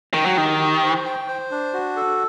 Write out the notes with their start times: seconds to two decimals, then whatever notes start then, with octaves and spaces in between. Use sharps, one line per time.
0.14 D#3 G5
0.26 F#3
0.37 D#3 G4
0.59 G4
0.83 C5
1.05 G5
1.28 C5
1.51 D4
1.73 F#4
1.96 A4